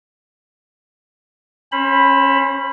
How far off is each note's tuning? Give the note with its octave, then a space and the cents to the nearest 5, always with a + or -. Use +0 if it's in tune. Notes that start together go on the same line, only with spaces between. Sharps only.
C#4 -20 C5 +30 B5 +0